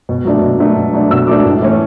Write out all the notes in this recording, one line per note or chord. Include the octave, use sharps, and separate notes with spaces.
B2
F#3 A3 D4
B2
F#3 A3 D4
B2
F#3 A3 D4
B2 E6
F#3 A3 D4 D6
A2
E3 A3 C#4